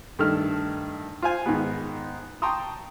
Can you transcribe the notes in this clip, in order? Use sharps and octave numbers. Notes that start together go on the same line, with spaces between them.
G2 D#3 A3 A4 A5 F6
F4 C5 F5 G#5
G#2 D#3 B3
G5 A5 A#5 C6 C#6 D#6